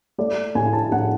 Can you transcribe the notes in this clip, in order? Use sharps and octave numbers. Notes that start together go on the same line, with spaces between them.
A3 D5
A2 G#5
A5
A2 F#5